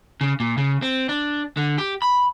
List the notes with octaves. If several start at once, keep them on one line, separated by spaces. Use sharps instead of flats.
C#3
A#2
C#3
C4
D4
D3
G4
B5